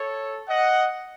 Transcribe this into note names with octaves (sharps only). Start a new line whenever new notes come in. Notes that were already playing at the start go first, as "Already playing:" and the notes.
Already playing: A4 C#5
D#5 F#5